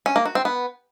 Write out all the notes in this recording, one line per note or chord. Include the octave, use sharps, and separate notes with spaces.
C#4
A#3
F#4
C4
B3